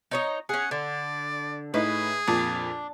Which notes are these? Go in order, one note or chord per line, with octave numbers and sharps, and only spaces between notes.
D#4 C#5 D#5
C#4 G#4 F#5
D3 D5
A2 D#4 G#4 B4
F2 A#2 D4